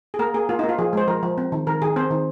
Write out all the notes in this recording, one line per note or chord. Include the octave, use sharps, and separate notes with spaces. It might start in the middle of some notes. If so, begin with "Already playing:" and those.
G#4
A#3 A#4
A#3 G#4
A#3 F4
D#4
A#3
F4
F3 G#4
G#3 C5
F3 A#4
F3
C4
D#3
D#3 A#4
D#3 G#4
C4 C5
D#3